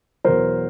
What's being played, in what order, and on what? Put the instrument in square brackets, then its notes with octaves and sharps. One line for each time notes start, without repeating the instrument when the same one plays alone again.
[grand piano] E2 B2 F#3 A#4 C5